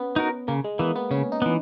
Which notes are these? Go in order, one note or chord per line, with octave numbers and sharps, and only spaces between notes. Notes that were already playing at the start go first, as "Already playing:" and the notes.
Already playing: B3 C#4
D#4 F#4 A#4
C#3 A#3
G#3
E3 A#3 B3
B3
C#3 C#4
D#4
E3 B3